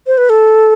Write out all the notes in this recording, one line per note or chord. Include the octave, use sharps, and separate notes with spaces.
C5
B4
A4